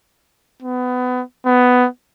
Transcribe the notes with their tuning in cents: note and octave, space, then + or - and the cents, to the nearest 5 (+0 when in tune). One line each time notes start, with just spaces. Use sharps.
B3 +25
B3 +10